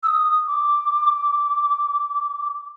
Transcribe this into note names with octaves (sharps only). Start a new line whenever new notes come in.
E6
D#6
D6